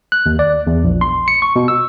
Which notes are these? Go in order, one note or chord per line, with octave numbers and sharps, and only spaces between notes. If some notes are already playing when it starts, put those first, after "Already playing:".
F#6
D#2
D5
E2
A#1
C6
C#7
C#6
B2
E6